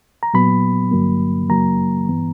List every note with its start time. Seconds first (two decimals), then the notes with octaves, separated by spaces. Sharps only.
0.23 A#5
0.34 A#2 F#3 B3 B5
0.91 G2 D3 F#3 A#3
1.50 F#2 C#3 F#3 A#3 A#5
2.08 G2 E3 B3